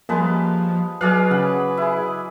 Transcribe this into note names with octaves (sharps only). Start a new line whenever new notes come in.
F3 G3 G#3 A#3 C#4 B4 A5
F#3 G#4 B4 D5 F5 F#6
C#3 F#5
E4 G#4